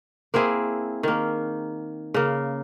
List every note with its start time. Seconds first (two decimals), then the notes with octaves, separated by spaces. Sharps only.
0.34 A#3 C4 E4 G#4
1.03 D#3 A#3
2.14 C#3 A#3